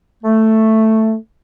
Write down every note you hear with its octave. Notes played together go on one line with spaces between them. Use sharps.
A3